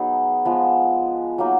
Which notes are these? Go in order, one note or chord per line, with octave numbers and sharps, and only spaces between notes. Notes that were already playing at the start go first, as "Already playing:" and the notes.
Already playing: F#3 B3 D#4 G#4
F3 G#3 B3
F#3 A#3 D#4